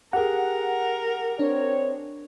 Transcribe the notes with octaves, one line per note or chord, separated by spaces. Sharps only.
G4 G#4 A#4 F#5
C4 D4 C#5